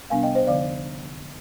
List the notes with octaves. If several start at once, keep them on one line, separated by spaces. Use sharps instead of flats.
C3 G3 B3 D4 F5 G#5
D#5 G5
C5 D#5
F2 D3 F3 B3 D5 F5